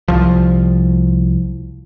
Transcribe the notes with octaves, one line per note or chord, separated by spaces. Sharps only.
C2 F3